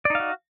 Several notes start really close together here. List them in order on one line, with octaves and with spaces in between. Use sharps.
D5 D#4 F5 F#4